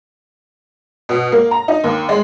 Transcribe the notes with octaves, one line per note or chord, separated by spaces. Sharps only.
B2
A#3
A#5
D#4
D#2
G#3